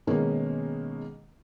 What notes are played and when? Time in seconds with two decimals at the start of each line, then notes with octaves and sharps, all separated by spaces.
0.07 B2 D#3 G#3 A#3 C#4